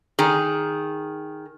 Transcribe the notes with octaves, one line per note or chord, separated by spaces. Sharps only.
D#3 G#4